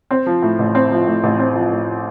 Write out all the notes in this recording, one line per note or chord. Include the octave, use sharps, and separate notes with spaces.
C4
F3
A2
A1
C4
F3
A2
A1
C4
F3
A2